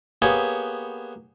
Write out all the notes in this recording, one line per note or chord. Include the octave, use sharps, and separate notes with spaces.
A#3 B3 G4 G#4 C#5 G#5